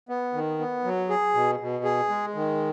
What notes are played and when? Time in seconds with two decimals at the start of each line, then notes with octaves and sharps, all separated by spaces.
0.09 B3
0.33 D#3
0.59 B3
0.84 F#3
1.10 G#4
1.34 B2
1.60 B2
1.84 G#4
2.09 G#3
2.35 D#3